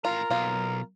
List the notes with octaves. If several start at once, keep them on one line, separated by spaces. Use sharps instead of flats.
A2 F4 A#4 A#5
B1 A#3 F4